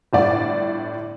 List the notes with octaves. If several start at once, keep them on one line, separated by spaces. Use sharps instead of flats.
G1 A2 D5